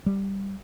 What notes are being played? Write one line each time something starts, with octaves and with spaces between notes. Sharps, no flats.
G3